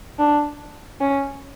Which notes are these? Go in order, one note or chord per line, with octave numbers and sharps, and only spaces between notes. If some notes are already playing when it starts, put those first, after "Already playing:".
D4
C#4